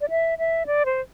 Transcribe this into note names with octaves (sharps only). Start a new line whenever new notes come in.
D5
E5
E5
D5
C5